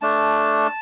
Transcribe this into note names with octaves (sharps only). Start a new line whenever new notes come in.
A3 D4 A5